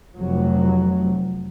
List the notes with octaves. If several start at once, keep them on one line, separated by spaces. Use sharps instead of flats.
F1 F#3